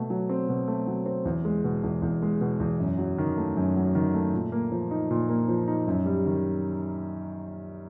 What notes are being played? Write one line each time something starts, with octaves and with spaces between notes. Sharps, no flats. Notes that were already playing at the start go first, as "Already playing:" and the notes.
Already playing: B2 A3
F#3
C4
B2
A3
F#3
C4
E2
G#3
B2
E2
E2
G#3
B2
E2
F#2
F#3
D#3
A3
F#2
F#3
D#3
A3
A#2
A#3
F3
D#4
A#2
A#3
F3
D#4
F#2
G3
D#3